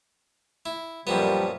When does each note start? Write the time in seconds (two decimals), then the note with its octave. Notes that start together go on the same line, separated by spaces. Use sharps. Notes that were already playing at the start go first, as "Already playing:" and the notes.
0.66 E4
1.07 F#2 A#2 F3 G3 B3